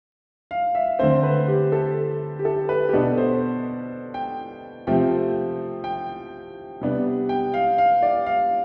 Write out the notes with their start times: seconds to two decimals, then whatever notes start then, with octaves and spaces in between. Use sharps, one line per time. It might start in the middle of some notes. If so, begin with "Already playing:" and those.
0.51 F5
0.75 E5
0.99 D3 A3 C4 C5
1.23 B4
1.48 G4
1.72 A4
2.39 G4
2.45 A4
2.69 B4
2.89 G4
2.93 B2 B3 D4 A4
3.18 C5
4.14 G5
4.87 C3 F3 A3 C4 G5
5.84 G5
6.81 C3 G3 B3 D4
7.29 G5
7.54 F5
7.78 F5
8.02 D5
8.26 F5